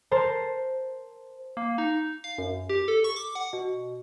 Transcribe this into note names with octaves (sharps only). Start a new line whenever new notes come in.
A#4 C5 A5
A#3
D#4
F5
F#2
G4
A4
C#6
D6
F#5
B2